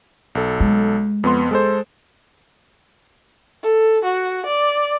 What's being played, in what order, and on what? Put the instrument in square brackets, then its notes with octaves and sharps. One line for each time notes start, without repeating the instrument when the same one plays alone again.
[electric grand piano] B1 A4
[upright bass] G#3
[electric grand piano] F2 B3 C6
G#3 A4 C5
[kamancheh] A4
F#4
D5